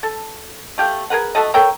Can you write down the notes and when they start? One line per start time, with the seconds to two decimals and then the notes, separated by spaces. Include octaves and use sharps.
0.03 A4
0.78 A3 G4 F5
1.10 G#4 A#4 B4 F#5
1.35 A3 F#4 A4 D#5
1.54 A4 A#4 C#5 G5